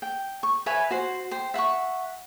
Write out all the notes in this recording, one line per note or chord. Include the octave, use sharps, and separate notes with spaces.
G5
C#6
B4 C#5 E5 G#5
F#4 C5
C5 G5
E5 F#5 B5 C#6